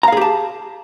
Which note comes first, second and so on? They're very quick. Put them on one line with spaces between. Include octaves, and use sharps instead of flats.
A#5 F5 G#4 G4 A5